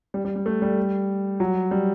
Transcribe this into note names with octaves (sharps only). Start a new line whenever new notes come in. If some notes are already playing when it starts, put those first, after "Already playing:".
G3
G3
G3
A3
G3
F#3
G3